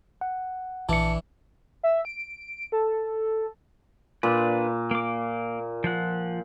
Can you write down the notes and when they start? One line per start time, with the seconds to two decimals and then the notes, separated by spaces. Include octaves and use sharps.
0.21 F#5
0.89 A#1 E3 D4 A5 C#7
1.83 E5
2.05 D7
2.72 A4
4.23 A#2 D4 B4
4.91 A#3 D6
5.84 F3 F#5